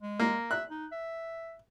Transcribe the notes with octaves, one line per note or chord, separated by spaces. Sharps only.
G#3
A#3
E5 F#6
D#4
E5